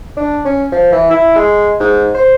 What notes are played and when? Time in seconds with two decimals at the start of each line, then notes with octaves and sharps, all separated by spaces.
0.17 D4
0.45 C#4
0.72 F3
0.92 E3
1.10 E4
1.35 G#3
1.80 G#2
2.15 C5